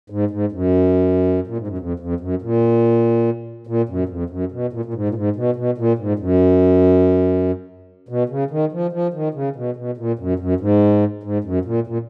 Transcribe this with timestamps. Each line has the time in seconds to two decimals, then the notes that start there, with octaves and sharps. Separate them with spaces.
0.10 G#2
0.31 G#2
0.52 F#2
1.47 A#2
1.57 G#2
1.67 F#2
1.78 F2
1.99 F2
2.20 F#2
2.42 A#2
3.67 A#2
3.89 F#2
4.09 F2
4.30 F#2
4.52 B2
4.73 A#2
4.85 A#2
4.94 G#2
5.09 A#2
5.15 G#2
5.36 B2
5.56 B2
5.78 A#2
5.98 G#2
6.19 F#2
8.09 B2
8.29 C#3
8.51 D#3
8.72 F3
8.93 F3
9.14 D#3
9.34 C#3
9.56 B2
9.76 B2
9.98 A#2
10.19 F#2
10.39 F#2
10.60 G#2
11.23 G#2
11.44 F#2
11.65 A#2
11.87 A#2